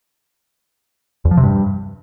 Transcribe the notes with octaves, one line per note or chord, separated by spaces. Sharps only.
E2
F3
C3
G2